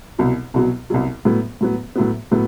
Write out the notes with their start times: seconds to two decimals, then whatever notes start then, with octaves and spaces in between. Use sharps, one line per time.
0.19 C2 B2 F#3
0.54 C2 B2 F#3
0.90 C2 B2 F#3
1.25 A2 F#3 B3
1.61 A2 F#3 B3
1.96 A2 F#3 B3
2.31 A2 F#3 B3